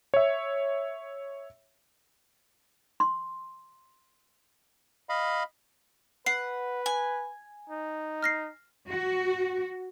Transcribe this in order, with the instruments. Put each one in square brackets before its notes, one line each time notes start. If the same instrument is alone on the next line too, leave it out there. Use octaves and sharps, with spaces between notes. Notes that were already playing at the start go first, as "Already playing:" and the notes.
[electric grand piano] C#5 E5
[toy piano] C6
[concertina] D#5 F5 B5
[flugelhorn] B4 [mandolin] F#5 [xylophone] C7
[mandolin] G#5
[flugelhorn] D#4
[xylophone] F6 A#6 C7
[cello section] F#4